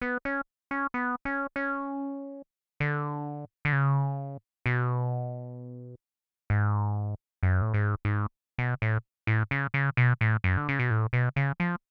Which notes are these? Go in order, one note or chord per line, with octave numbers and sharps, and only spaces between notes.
B3
C#4
C#4
B3
C#4
C#4
D3
D3
C#3
B2
G#2
F#2
A2
G#2
G#2
B2
A2
A2
C#3
C#3
B2
A2
F#2
D3
C#3
B2
A2
B2
C#3
F3